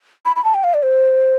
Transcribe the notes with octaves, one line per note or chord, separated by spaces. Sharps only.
B5
B5
A5
G5
F5
D5
C5